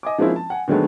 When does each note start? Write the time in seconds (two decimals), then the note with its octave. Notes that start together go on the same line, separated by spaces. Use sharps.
0.03 D#5 G#5 D6
0.18 F3 G#3 A#3 C4 C#4 E4
0.36 A5
0.50 F#5 G#5
0.68 D3 D#3 F#3 G#3 A3 B3